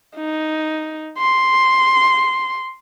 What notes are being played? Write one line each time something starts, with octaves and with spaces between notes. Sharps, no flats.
D#4
C6